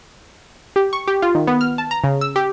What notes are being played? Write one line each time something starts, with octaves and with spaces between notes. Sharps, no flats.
G4
C#6
G4
F4
D#3
B3
F6
A5
A#5
C#3
E6
G4